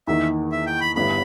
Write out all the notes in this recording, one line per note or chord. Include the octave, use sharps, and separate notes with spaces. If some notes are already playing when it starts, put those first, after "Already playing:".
E2 D#3 A#3 D#4 E5
E5
G5
B5
G1 G2 G3 B3 E4 B5